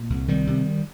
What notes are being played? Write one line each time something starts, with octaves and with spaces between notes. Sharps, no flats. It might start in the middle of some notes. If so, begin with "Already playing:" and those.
Already playing: A#2
C2
C3 D#3 G3
C3